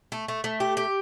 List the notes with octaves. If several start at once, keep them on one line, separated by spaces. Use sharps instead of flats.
A3
A3
A3
G4
G4